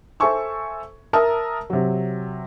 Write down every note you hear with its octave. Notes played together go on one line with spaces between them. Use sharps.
A4 C5 E5 G#5 C#6 E6
A#4 E5 A5 A#5 D#6 E6
C3 F#3